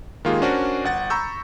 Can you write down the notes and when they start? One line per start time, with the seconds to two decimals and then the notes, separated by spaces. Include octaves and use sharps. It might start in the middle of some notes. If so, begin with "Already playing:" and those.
0.25 D#3 G#3 A#3 F4 G4 G#4
0.42 C#4 D4 F#4 A#4 C5 D5
0.84 G1 F#5 A6
1.10 A#5 B5 C#6 E6 G6